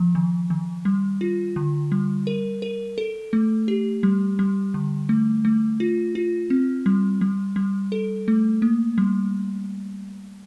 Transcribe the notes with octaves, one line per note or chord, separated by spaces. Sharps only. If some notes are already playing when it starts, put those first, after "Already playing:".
Already playing: F3
D#3
D#3
G3
F4
D3
G3
A#4
A#4
A4
A3
G4
G3
G3
D3
A3
A3
F4
F4
C4
G3
G3
G3
A4
A3
A#3
G3